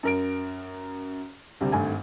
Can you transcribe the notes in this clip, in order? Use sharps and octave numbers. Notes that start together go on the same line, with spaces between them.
F#2 A#4 D7
D2 C3 G3
G#1 G2 A3 G#5